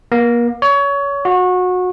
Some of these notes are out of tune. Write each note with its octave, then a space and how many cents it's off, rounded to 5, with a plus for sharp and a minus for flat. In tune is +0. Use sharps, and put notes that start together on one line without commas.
A#3 +35
C#5 +25
F#4 -25